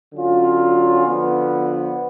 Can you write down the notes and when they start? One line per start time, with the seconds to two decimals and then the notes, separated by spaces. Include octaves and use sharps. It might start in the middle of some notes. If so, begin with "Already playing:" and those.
0.14 D3 F#3 C#4 F4
1.06 D3 F3 B3